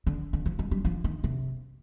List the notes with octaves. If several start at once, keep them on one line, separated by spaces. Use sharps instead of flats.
D3
D3
F3
G#3
G3
F3
D#3
C3